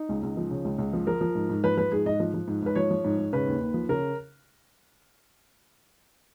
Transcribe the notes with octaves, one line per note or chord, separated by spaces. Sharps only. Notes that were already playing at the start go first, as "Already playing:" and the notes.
Already playing: D#4
C#2
C#2
F3
C#3
C#2
C#2
F3
F3 A#4
F3
G#2
G#2
F3 B4
F3 B4
G#2 G#4
G#2 D#5
F3
F3
G#2
G#2 B4
F3 C#5
F3
G#2
G#2
C#3 B4
D#2
D#2
F3
C#3 A#4